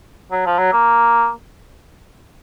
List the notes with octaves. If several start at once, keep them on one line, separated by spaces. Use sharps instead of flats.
F#3
F3
F#3
A#3